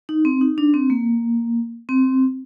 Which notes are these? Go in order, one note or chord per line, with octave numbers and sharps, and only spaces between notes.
D#4
C4
D#4
D4
C4
A#3
C4